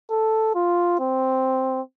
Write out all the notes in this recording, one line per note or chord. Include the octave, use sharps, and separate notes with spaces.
A4
F4
C4